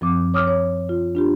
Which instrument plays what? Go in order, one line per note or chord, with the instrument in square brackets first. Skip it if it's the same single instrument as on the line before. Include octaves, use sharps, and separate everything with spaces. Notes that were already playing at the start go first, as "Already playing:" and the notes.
[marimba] F#2 F3 C4 D6
C#5 D6 D#6 F6
C#5
F4
D4 F4 G4